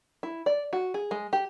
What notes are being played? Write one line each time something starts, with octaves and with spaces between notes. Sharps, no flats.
E4
D5
F#4
G#4
G#3
G4